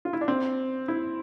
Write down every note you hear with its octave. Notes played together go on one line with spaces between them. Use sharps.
F4
E4
D4
C4
E4